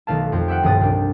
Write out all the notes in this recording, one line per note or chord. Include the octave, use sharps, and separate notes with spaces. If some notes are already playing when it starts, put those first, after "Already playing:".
B1 D#3 A3 F5 A5
F2 C5
G4 E5 F#5 G5
D#1 B1 G2 G3 D#6 A6
C2 D4